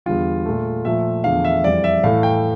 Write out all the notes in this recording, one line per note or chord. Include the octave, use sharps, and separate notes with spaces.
E2 D3 G3 F4
A#2 A3
A#2 F3 A3 E5
E2 D3 F3 A3 F5
E5
F2 E3 G3 D5
E5
A2 E3 A3 F5
G5